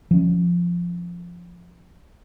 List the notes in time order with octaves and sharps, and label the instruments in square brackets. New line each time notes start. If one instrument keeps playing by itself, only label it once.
[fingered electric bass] F3 C#4